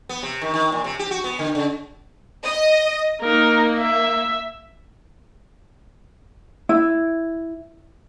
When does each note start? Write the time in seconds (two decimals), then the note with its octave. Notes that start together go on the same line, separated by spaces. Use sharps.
0.09 B3
0.23 C3
0.42 D#3
0.54 D#3
0.72 A#2
0.84 C3
0.99 G4
1.11 F#4
1.24 B3
1.39 D3
1.55 C#3
2.43 D#5
3.22 A#3 D#4 A#4
3.79 E5
6.69 E4